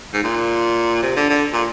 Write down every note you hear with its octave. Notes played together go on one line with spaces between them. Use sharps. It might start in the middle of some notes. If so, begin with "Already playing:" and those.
G#2
A#2
C3
D3
D3
A#2